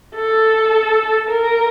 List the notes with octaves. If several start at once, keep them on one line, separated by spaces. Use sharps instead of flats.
A4
A#4